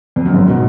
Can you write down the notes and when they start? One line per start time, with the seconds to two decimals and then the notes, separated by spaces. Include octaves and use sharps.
0.16 F2
0.26 F#2
0.34 G#1 G#2
0.49 B2